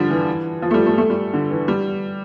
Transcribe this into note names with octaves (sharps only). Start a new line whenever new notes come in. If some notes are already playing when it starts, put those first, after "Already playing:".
Already playing: D3 F3 G3
E3
F3
A3
G3
A3
A3
G3
D3
E3
G3